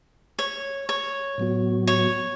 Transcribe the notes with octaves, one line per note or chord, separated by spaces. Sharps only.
C#5
C#5
A2 F#3 B3 F#4
C#5